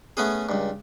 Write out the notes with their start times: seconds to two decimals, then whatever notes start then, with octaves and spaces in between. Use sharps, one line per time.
0.17 A3 B3 C#4 G#4
0.49 C#2 G2